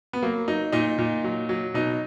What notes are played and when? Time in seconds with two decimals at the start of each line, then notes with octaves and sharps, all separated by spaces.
0.13 B3
0.22 F#3 A#3
0.48 F#3 D#4
0.73 A#2 D#4
0.98 A#2
1.24 F#3
1.49 F#3
1.74 B2 D#4